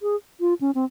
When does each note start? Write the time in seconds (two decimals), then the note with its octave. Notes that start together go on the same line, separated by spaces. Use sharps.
0.02 G#4
0.40 F4
0.61 C#4
0.75 C4